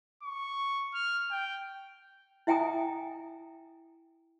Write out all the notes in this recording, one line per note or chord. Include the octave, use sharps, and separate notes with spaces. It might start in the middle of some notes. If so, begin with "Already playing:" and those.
C#6
F6
G5
E4 E5 G5 G#5 A#5 D#6